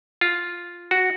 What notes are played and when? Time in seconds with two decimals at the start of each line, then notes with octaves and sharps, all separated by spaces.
0.21 F4
0.91 F#4